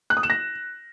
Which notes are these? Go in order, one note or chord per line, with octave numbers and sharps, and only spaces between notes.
F#6
D#6
E7
A#6